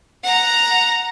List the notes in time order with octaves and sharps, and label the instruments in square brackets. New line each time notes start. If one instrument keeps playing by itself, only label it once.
[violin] F#5 A#5